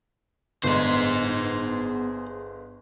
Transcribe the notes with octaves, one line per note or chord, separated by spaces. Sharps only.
G1 G#3 B3 G#4 C5